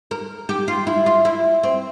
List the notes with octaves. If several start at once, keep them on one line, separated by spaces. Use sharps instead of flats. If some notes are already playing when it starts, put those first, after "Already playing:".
A#4
G4
F4
E4
F4
E4
C4